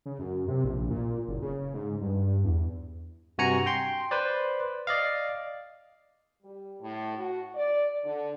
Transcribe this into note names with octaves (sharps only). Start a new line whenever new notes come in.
C#3
F#2
C3
A#1
A#2
F#1
C#3
G#2
G2
E2
G2 C3 F#4 G#5 A#5 C#7
G5 C6
B4 C5 D5
D5 D#5 F5
G3
A2
F#4
D5
D3